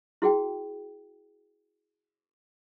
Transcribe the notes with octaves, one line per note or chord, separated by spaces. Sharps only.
E4 F#4 G#4 G5